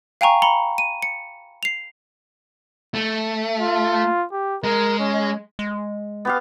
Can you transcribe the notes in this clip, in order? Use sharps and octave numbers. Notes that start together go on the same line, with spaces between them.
F5 G5 G#5 A#5 C#6
A#5 B5 C#7 G7
D#7
C#7
C7 F7
A3
F4
G4
G#3 A#4
C#4
G#3
B3 G4 F5